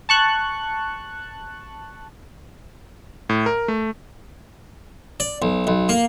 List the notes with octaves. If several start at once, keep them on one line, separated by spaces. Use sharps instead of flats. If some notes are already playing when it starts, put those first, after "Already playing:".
A5 C#6 F#6
A2
A#4
A3
D5
B1
B1
A#3